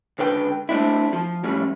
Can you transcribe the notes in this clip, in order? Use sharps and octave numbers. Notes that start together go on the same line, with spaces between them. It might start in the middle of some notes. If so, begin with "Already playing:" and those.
C#2 D3 B4 G5
A3 C4 D4 E4
F3
F2 A2 G3 C#4